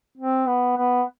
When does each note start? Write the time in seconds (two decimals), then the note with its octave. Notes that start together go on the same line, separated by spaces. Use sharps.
0.18 C4
0.47 B3
0.78 B3